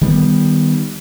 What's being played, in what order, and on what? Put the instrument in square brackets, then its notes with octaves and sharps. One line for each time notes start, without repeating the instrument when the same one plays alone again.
[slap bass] D#3 G3 B3